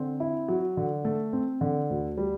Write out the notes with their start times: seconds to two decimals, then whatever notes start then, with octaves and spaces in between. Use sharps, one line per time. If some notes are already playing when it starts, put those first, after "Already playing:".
Already playing: D3 C4
0.20 E4
0.48 F#3
0.77 D3
1.05 A3
1.33 C4
1.61 D3
1.90 D2
2.17 G3